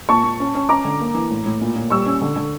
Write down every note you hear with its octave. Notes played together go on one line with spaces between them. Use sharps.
A#2 A5 C#6
A#2
C#4
C#4
C#4 A#5 D6
D3
A#3
E3
A2
A2
A#2
A#2
G3 C#6 E6
C#4
D3
D3